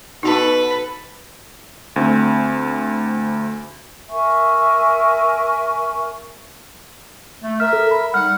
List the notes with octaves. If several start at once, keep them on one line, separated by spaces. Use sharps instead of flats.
B2 D#4 F#4 A4 B4 A5
D2 C4
A#4 E5 G#5 C#6
A3
A#4 E5 F6
A4
B5
G3 D#4 F#5 F6